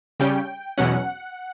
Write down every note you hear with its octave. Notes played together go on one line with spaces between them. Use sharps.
C#3 G3 C#4 G5
E2 B2 F#3 C#4 F#5